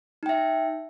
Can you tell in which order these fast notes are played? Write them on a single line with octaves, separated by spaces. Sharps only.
D#4 G5 E5